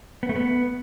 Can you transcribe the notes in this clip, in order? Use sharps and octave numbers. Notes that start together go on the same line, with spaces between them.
B3
A3
B3